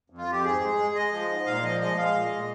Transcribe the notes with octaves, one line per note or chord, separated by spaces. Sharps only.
F2
F4
F2 G4
G#2 G#4
G#3
G#3
G#3 D#5
F3
G#2
A#2 F5
F3 D#5
G#3 D#5
G#3 F5
A#2
D#5
A#2